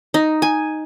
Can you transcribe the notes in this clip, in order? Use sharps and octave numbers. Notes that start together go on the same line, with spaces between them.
D#4
G#5